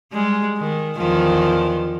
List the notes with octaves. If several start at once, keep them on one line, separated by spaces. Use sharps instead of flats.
G3 G#3
D#3
E2 D#3 F3